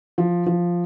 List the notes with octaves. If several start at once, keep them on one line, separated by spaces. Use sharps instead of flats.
F3
F3